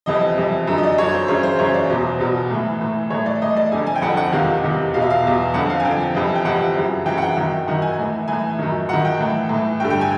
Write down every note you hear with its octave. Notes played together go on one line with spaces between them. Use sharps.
F2 C3 E3 D#5
F2 C3 E3
F#2 D3
D#5
D5
F#2 D3 C#5
C5
F#2 C#3 E3 C#5
C5
F#2 C#3 E3 C#5
D5
E2 B2 C5
E2 B2
A2 E3
A2 E3
A2 E3 C#5
D5
A2 E3 D#5
D5
F2 D3 G#5
G#5
G5
F2 F#5
D3
F#5
E2 C3 D#3 F5
E2 C3 D#3
E2 B2 F5
E5
F5
E2 B2
F2 D3 F#5
F5
G#5
F2 D3 G5
F2 C3 E3
G5
F2 C3 E3 F#5
F#2 C#3 E3
F#2 C#3 E3 G5
F#5
G5
F#2 D#3
F#2 D#3 F#5
G#5
A2 E3
A2 E3 G#5
F#2 D#3
F#2 D#3 F#5
G5
A2 E3
A2 E3
G2 D3 G5
G5
G#5